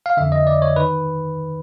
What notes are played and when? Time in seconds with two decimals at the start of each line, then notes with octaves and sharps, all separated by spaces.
0.06 F5
0.17 F2 D3 E5
0.32 D#5
0.47 D5
0.62 C#5
0.76 D#3 B4